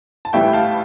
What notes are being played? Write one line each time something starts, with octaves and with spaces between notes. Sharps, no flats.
A5
A1 A2 E3 G3 B3 E5 G5
F5 A5